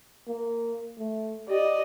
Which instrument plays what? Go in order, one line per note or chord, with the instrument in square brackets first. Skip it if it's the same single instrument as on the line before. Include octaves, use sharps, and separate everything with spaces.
[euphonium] A#3
A3
[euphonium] G4 [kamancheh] D5 D#5